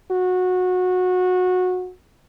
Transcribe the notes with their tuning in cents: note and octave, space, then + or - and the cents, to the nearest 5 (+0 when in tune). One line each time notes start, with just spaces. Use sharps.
F#4 -20